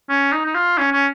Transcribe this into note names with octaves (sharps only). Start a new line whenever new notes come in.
C#4
D#4
D#4
F4
C#4
C#4